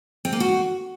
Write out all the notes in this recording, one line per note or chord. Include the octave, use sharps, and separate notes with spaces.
C4
A#3
F#4